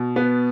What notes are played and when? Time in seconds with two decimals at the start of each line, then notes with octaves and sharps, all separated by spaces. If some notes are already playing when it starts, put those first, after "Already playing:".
Already playing: B2
0.16 B3